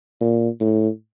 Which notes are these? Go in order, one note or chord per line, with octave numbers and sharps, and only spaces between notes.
A#2
A2